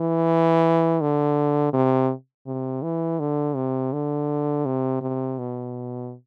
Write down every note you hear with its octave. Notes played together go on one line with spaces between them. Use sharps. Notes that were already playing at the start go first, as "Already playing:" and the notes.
Already playing: E3
D3
C3
C3
E3
D3
C3
D3
C3
C3
B2